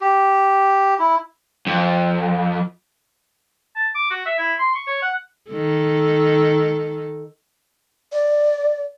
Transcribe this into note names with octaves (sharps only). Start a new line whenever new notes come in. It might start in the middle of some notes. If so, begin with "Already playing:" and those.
G4
E4
F2
A5
D6
F#4
E5
E4
C6
C#6
C#5
F#5
D#3 A4
D5